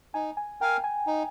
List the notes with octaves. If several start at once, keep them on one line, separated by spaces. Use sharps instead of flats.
D#4 G#5
G#5
A#4 F5 G5 G#5
G#5
D#4